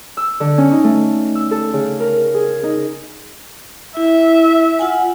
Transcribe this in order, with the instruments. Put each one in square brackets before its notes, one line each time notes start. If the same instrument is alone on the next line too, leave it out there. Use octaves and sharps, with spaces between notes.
[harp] E6
D3
C#4
D#4
A3
E6
A4
C#3
A#4
G#4
D#4
[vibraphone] E4 [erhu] E5
[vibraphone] F4 F#5 G#5